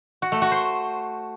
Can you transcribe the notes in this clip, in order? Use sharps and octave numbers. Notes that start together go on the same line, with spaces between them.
F#4
A3
F#4
C5